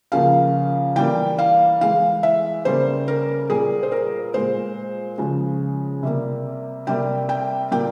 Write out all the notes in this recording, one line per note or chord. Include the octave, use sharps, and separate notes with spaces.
C#3 F3 A#3 F5
E3 G3 A#3 G5
F5
E3 G#3 F5
E5
C#3 G3 A#3 C5
A#4
A#2 G3 A#3 G#4
C5
A#4
A#2 G#3 C5
C#3 F3 G#3
C3 G3 A#3
C3 G3 A#3 G5
G5
A#2 G3 A#3 G5